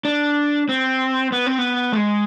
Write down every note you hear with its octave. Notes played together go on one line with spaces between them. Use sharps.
D4
C4
B3
C4
B3
A3
G#3